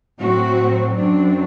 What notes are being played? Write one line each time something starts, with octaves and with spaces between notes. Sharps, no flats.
A2 F#3 C4 F#4
F#2 F#3 C4 D4